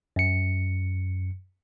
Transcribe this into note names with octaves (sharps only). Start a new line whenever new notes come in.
F#2 C#7